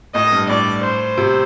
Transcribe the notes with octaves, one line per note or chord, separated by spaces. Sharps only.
A2 D#5
G2
A2 D5
C5
C3